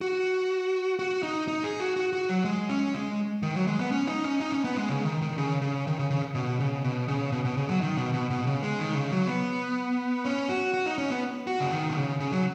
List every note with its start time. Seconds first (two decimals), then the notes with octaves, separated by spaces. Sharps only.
0.01 F#4
0.99 F#4
1.23 D#4
1.48 D#4
1.64 G#4
1.80 F#4
1.96 F#4
2.13 F#4
2.29 F#3
2.45 G#3
2.69 C#4
2.94 G#3
3.43 D#3
3.55 F#3
3.67 G#3
3.79 B3
3.92 C#4
4.07 D#4
4.24 C#4
4.40 D#4
4.52 C#4
4.64 B3
4.77 G#3
4.89 C#3
5.05 D#3
5.22 D#3
5.38 C#3
5.62 C#3
5.87 D#3
5.99 C#3
6.10 C#3
6.35 B2
6.60 C#3
6.84 B2
7.08 C#3
7.32 B2
7.45 B2
7.57 C#3
7.69 F#3
7.81 D#3
7.97 B2
8.14 B2
8.30 B2
8.47 C#3
8.62 G#3
8.79 D#3
8.95 C#3
9.12 F#3
9.27 B3
10.25 C#4
10.49 F#4
10.74 F#4
10.86 D#4
10.98 C#4
11.10 B3
11.47 F#4
11.60 C#3
11.71 D#3
11.89 B2
11.96 C#3
12.20 C#3
12.32 F#3